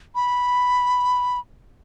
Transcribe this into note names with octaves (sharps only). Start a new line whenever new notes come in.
B5